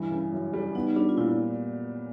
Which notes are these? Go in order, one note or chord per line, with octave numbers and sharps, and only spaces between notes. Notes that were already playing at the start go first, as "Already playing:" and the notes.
Already playing: G2 E3
C#3
F#2
G3
B3 D#4
G3 D4
F4
A#2 E4